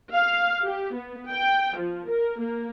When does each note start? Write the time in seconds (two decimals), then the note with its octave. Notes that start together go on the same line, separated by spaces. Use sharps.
0.15 F5
0.64 G4
0.95 B3
1.31 G5
1.79 F3
2.10 A#4
2.41 A#3